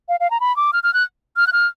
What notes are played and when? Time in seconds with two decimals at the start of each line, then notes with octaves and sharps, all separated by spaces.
0.09 F5
0.20 F5
0.31 A#5
0.40 B5
0.56 D6
0.73 F6
0.83 F6
0.94 F#6
1.36 F6
1.47 F#6
1.53 F6